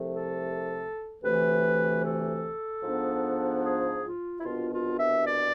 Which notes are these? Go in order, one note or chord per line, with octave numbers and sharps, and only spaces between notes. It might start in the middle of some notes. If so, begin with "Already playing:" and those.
Already playing: C2 C3 F3 A3
A4
D2 C3 E3 A3 B4
A4
G#2 F3 B3 D4
G#4
F4
E4
C2 B2 B3 D4 F4
F4
E5
D5